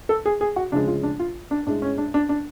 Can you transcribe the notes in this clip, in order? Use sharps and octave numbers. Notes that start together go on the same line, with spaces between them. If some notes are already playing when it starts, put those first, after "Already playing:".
A4
G#4
G#4
F#4
D2 C#3 F3 G#3 D4
F4
D4
F4
D4
A2 G#3 D4
C#4
D4
D4
D4